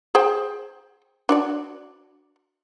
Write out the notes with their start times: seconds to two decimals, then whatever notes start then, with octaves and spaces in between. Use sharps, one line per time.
0.15 G#4 C5 G5
1.29 D4 F#4 D5